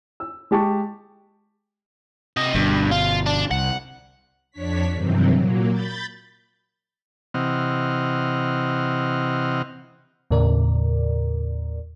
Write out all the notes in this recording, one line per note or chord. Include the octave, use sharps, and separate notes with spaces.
E6
G#3 G4 A5 C#6
C3 D#5
G1 G2 B2
F4
D4
C2 F#5
F2 D4 C#5 B6
G2 C3 D#3 E3 F#3 C4
A#2 F#3 A#3
B5 G6 A6
C3 E3 C4 D#5 F#5 F6
D#2 A2 C#3 A#4 D5